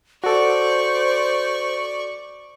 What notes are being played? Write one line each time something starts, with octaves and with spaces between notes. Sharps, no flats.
F#4 A4 C5 D5 C#6